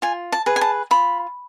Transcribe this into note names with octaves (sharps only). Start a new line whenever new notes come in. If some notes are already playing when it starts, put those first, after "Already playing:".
F4 G#5
A5
G#4 B4
G#5
A5
F4 B5